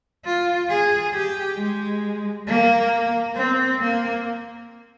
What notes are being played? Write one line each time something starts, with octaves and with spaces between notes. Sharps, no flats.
F4
G#4
G4
G#3
A#3
C4
A#3